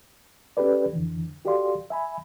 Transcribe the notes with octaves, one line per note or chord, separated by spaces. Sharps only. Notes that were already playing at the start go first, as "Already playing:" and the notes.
C#4 G4 A4 B4 D5
F2 D3 E3
F#4 G4 A4 D5 F5 C6
E5 G#5 B5